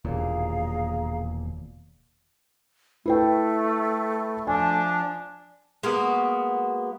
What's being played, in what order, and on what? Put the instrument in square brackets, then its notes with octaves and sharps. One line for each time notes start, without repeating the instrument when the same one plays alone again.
[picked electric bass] E1 D#2 A#2 [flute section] G#4 F5 A#5
[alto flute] A3 [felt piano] E4 B4 G5
[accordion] F3 D4 [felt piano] G#5
[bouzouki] G#3 A#3 B3 F#4